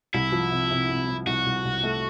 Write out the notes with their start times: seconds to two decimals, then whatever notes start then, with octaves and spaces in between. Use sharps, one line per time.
0.14 C2 E4
0.32 F3
0.51 C3
0.71 C3
0.89 C3
1.08 C3
1.27 C2 F#4
1.46 C2
1.65 C2
1.83 A3